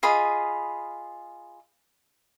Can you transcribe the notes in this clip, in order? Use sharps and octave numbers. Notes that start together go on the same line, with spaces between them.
F4 G#4 D#5 B5